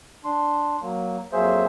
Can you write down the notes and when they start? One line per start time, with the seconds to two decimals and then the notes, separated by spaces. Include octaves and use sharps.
0.25 D4 C6
0.82 F#3 A#3
1.32 F2 F#3 A#3 G#4 C5 E5